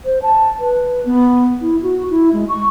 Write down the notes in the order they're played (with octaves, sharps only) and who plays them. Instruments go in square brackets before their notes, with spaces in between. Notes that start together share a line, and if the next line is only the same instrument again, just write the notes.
[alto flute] C5
A5
B4
B3
E4
F#4
E4
G#3
C#6